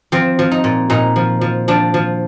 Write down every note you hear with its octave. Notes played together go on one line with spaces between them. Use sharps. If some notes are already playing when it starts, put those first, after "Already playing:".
F3 C4
F3
D#4
A#2
A#2 D#4
F3
F3
F3 D4
F3